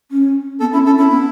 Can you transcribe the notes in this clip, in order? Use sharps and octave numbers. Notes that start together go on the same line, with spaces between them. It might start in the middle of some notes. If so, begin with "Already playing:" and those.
C#4
B3 A4
C#4 E4
C#4 A4
C#4 E4
B3